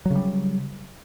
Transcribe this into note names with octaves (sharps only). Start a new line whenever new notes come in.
C#3 F#3 G3